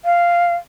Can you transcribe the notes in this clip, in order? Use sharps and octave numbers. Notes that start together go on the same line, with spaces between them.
F5